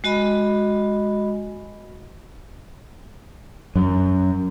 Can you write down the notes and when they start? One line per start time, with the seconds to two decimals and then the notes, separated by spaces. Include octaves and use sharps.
0.04 G#3 F#4 D#5 B5
3.76 F#2